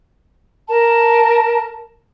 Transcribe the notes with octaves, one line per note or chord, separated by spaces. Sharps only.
A#4 A5